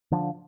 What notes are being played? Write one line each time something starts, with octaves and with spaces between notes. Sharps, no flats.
D3 F3 D4